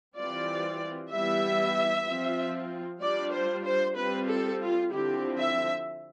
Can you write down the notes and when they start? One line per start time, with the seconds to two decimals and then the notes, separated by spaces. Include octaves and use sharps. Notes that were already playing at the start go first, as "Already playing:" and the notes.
0.17 E3 G3 C4 F4 D5
1.11 E3 G3 B3 E4 E5
2.06 F3 C4 F4
3.01 G3 D4 F4 D5
3.32 C5
3.64 C5
3.96 G3 C4 F4 B4
4.27 A4
4.59 F4
4.91 D3 F3 C4 E4 G4
5.38 E5